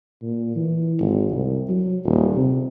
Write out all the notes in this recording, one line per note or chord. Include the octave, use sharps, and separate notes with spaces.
A#2
E3
G#1
C2
F#3
D#1
C3